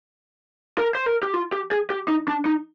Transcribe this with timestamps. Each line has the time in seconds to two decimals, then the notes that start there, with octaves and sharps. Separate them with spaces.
0.78 A#4
0.95 C5
1.06 A#4
1.23 G4
1.34 F4
1.53 G4
1.72 G#4
1.90 G4
2.08 D#4
2.28 D4
2.46 D#4